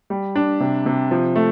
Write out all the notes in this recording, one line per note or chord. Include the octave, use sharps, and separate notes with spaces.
G3
D4
C3
C3
F3
A3